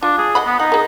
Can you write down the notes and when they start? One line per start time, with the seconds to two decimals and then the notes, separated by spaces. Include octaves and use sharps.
0.03 D4 F4
0.18 G#4
0.35 D#5 F#5 B5
0.46 B3
0.60 D#4 F#5
0.72 G#4 A#4